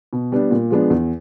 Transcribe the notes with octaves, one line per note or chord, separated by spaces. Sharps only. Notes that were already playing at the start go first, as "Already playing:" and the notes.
B2
G3 B3 D4
A#2
F3 G#3 B3 D4
E2